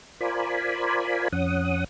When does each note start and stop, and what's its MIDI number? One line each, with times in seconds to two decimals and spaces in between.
0.21 1.28 65
0.21 1.28 70
0.21 1.28 72
0.21 1.28 74
0.21 1.28 80
0.21 1.28 83
1.33 1.84 41
1.33 1.84 61
1.33 1.84 78
1.33 1.84 87